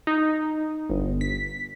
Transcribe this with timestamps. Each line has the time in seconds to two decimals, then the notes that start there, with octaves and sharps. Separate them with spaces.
0.07 D#4
0.90 G1
1.21 B6